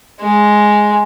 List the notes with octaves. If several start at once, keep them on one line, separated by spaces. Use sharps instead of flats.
G#3